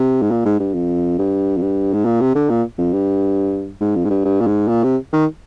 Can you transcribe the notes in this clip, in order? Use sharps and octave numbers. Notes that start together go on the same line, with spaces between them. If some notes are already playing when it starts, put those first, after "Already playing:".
Already playing: C3
G#2
A#2
G#2
G2
F2
G2
F2
G2
G#2
A#2
C3
D3
A#2
F2
G2
G#2
F2
G#2
G2
G2
A#2
G#2
A#2
C3
D#3